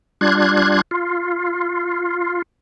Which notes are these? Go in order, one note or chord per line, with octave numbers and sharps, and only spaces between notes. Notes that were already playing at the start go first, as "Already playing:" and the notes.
G3 D4 F4 F#6 G#6
F4